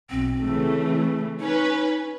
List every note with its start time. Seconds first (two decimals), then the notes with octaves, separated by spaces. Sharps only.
0.10 B1 C4
0.41 C#3 E3 A3
1.40 C#4 D#4 B4